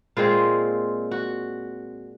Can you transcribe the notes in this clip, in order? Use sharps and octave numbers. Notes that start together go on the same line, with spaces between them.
A#2 G#3 C4 F4
F#4